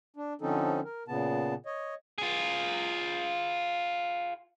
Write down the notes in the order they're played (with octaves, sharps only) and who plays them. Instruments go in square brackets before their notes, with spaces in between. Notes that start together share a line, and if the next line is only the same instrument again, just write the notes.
[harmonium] D4
D3 F3 C4 C#4 D#4 A4
A#4
A#2 C#3 B3 A5
C#5 D#5
[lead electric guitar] F4 G#4